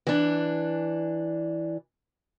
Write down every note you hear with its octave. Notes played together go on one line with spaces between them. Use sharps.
E3 D4